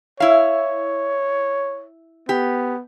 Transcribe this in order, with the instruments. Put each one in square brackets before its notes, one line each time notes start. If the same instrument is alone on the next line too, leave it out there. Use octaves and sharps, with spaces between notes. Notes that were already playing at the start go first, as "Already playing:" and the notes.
[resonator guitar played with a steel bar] E4 F5 [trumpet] C#5
[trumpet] B3 [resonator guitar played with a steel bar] G4